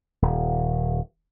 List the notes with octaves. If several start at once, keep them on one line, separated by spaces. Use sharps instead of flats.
D#1